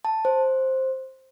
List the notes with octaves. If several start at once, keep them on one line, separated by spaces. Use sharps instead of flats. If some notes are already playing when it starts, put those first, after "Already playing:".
A5
C5